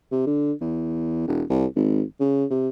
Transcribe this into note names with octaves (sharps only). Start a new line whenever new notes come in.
C3
D3
E2
E1
C2
G#1
C#3
C3